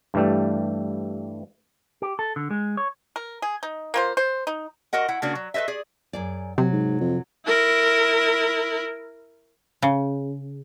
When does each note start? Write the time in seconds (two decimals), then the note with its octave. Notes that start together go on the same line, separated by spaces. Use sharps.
0.14 G2 E3 G3 A3
2.02 G4
2.19 A4
2.36 D3
2.51 G#3
2.77 C#5
3.16 A#4
3.42 G#4
3.63 D#4
3.94 A#3 F4 C5
4.17 C5
4.47 D#4
4.93 F#4 A#4 D#5 F#5
5.08 E4 F#5
5.22 C#3 A#3 D4 F#4
5.35 F#3
5.54 A4 B4 C5 D#5 E5
5.68 G#4 D5
6.13 F#2 G#4 D5
6.58 C3 F#3
6.73 G#2
7.00 F2
7.47 E4 A#4
9.82 C#3